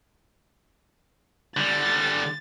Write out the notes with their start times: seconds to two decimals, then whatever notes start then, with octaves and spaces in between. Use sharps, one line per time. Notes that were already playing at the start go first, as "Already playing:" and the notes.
1.57 D3 G3 A6